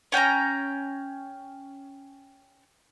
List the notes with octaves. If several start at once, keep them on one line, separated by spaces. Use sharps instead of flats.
C#4 G5 G#5 A#5